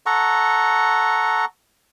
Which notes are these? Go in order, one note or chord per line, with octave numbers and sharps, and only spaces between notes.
A4 F#5 A#5 C#6